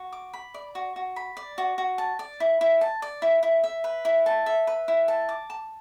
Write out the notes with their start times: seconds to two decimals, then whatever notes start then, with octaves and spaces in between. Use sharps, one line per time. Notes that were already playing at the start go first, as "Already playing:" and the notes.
Already playing: F#4
0.13 D6
0.34 B5
0.54 D5
0.75 F#4
0.96 F#4
1.16 B5
1.37 D5
1.58 F#4
1.78 F#4
1.98 A5
2.19 D5
2.40 E4
2.61 E4
2.81 A5
3.02 D5
3.22 E4
3.43 E4
3.64 E5
3.84 B4
4.05 E4
4.26 A5
4.46 E5
4.67 B4
4.88 E4
5.08 A5
5.29 D6
5.50 A5